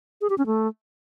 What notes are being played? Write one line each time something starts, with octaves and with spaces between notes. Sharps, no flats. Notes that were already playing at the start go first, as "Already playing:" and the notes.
G#4
G4
C#4
A3